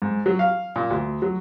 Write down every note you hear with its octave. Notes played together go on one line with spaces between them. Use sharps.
G#2
F#3
F5
A#2
D2
F#3